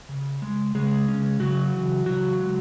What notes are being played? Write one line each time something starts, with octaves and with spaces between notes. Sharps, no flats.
C#3
G#3
C#3 G#3 G#4
C#4
C#3 F#3 F#4
E3
C#3 F#3 F#4
G#3